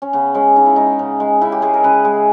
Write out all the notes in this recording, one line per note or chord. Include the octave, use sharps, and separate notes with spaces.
C#4
C#3 B3
G#3 C#4
C#3 D#4
E4
G#3 D#4
C#3
G#3
C#3 E4
G4
G#3 G#4
A#4
C#3 B4
G#3